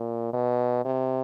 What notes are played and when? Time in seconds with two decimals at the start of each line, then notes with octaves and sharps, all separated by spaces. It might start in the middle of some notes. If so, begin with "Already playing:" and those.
Already playing: A#2
0.33 B2
0.85 C3